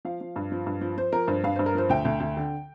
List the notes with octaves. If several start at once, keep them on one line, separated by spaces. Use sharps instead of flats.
F3 F5
F3
G2
F3
G2
F3
F3 C5
F3 A#4
G2 C5
G2 F5
G2 C5
A#4
F3 C5
D2 G5
D2
D2
D3